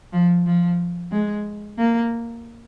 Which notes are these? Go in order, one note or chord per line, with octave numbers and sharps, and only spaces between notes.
F3
F3
G#3
A#3